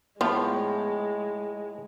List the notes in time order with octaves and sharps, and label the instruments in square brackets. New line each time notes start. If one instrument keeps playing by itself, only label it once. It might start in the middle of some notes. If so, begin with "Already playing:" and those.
[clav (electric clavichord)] A2 F3 [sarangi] G#3 [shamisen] B3 F4